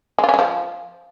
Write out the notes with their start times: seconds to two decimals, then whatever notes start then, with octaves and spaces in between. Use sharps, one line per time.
0.19 G#3
0.24 F4
0.29 C#4
0.34 G#3
0.39 F3